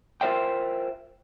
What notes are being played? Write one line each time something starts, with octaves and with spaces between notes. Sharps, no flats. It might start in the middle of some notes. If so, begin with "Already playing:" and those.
F4 A#4 C5 E5 G5